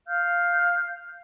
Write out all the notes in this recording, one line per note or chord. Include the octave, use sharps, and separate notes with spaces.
F5 F6 G6